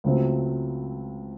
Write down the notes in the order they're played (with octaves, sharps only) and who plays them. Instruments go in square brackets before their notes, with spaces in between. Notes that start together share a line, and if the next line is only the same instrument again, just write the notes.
[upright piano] C#2 C#3 F#3 A3 C4